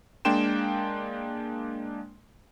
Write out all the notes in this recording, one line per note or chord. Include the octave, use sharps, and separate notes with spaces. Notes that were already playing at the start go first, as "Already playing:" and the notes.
G#3 A#3 D4 G5 C6 E7